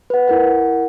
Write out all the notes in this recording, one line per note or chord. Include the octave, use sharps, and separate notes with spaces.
B4 F#5
E4 A#4 F#5